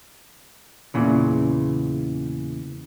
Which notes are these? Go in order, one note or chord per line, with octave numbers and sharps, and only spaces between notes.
E2 A#2 C#3 E3